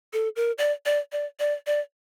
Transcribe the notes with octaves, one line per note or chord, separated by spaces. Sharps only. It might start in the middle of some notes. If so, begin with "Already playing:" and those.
A4
A#4
D5
D5
D5
D5
D5